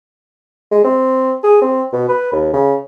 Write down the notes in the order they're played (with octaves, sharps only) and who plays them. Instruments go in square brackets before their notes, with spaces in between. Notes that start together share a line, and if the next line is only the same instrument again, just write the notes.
[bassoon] G#3
C4
G#4
C4
B2
B4
D#2
C#3